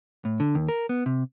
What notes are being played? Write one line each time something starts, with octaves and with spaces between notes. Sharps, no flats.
A2
D3
D#2
A#4
B3
C3